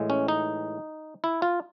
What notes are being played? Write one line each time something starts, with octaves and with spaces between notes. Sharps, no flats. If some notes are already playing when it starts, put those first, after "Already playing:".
Already playing: A2 E3 G#3
C#4
D#4
E4
F4